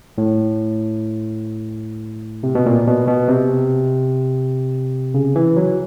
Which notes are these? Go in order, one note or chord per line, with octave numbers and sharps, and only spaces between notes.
A2
C3
B2
A#2
B2
B2
C3
C#3
E3
F#3